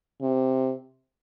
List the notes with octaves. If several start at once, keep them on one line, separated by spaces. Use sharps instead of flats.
C3